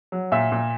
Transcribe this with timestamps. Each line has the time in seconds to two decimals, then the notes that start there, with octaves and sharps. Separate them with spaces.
0.12 F#3
0.32 A#2 E5
0.52 A#2